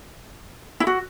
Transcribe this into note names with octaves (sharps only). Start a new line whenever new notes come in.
E4
F#4